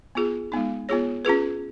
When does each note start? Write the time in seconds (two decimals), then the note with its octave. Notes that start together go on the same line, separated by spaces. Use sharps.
0.15 B3 F4 G#4
0.52 G#3 B3 D#4
0.89 B3 F4 G#4 C#5
1.25 C#4 F4 G#4 B4